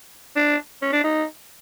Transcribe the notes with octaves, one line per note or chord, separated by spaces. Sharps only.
D4
C#4
D4
D#4